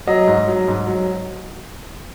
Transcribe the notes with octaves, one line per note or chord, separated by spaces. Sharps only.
F#3 D#5
G#2
F#3
G#2
F#3